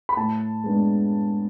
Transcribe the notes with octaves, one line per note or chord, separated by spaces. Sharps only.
B5
A2 A5
G#3 B3 D4